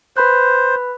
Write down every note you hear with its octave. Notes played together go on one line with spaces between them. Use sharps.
B4 C5 B5 F#6